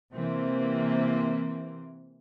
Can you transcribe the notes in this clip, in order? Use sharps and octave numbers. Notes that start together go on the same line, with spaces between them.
C3 E3 A#3 C4